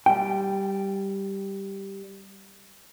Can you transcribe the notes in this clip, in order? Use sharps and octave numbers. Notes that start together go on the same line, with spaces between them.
G3 G5